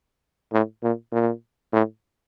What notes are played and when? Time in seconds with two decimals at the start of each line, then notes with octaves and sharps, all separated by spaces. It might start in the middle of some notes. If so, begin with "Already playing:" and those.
0.52 A2
0.83 A#2
1.12 A#2
1.73 A2